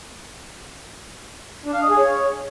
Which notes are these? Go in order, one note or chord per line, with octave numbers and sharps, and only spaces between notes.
D4
F5
D#5
G#4
C#5